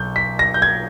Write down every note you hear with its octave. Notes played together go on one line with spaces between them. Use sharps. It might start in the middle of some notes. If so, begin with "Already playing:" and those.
Already playing: B1 G6
B6
A#6
G6
G#6